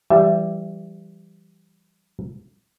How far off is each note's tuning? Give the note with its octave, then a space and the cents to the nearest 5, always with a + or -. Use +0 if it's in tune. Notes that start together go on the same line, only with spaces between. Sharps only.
E3 +35 G3 -5 E5 +20